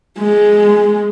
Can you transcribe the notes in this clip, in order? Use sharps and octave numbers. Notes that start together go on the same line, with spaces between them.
G#3